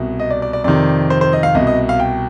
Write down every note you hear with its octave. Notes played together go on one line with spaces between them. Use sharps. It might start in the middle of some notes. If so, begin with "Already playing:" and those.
Already playing: C2 B2
D#5
D5
D5
D5
F2 C3 D#3 D5
C5
C5
D#5
F5
C2 B2 D#5
D#5
F5
G5